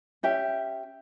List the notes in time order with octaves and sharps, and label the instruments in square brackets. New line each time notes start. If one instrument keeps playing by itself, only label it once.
[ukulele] C#4 G4 E5 G5